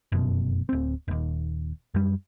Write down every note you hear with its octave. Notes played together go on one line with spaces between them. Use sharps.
F1 F#2 B2
D1 C4
D#1 D#2
F#2 G3